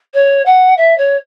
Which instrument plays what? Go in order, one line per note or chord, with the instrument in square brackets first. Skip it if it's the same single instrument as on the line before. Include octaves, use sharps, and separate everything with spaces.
[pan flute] C#5
F#5
E5
C#5